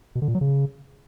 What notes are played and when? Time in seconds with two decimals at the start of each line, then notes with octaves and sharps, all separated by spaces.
0.15 B2
0.22 D3
0.28 A#2
0.35 F#3
0.41 C#3